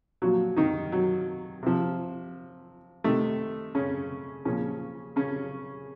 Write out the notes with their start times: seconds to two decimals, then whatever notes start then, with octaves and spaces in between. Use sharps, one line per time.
0.22 A#2 F3 F#3 F#4
0.56 D#3 D#4
0.92 F#3
1.63 C3 F3
3.04 C3 D#3 A3
3.75 C#3 C#4
4.45 A#2 C#3 F3 C#4
5.16 C#3 C#4